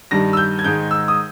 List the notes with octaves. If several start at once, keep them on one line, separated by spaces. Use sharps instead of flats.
G2 D#3 G3 A#6
E6
G6
G#6
G#2 D#3 G#3 D#4 G6
E6
D#6